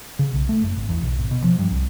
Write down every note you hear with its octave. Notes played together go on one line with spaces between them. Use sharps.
C#3
B1
A3
F#1
G#1
E2
B1
G#1
B2
F3
G2
C2